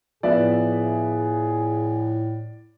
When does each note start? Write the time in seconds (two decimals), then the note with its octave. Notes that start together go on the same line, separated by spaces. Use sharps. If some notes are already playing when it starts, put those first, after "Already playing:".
0.23 A2 F3 B3 G#4 D5 E5